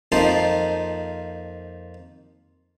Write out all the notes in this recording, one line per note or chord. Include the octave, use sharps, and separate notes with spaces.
F2 F3 A#3 D#4 C5 A5